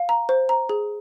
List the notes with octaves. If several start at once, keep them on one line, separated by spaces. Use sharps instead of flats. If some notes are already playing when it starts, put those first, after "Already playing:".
Already playing: F5
A#5
C5
A#5
G#4